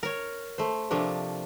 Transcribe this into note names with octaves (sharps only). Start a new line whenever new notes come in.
A#4 C#5
A3 C5
C3 F3 A3 A#3 D4